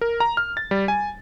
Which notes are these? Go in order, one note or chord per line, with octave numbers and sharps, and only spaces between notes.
A#4
A#5
F6
A6
G3
G#5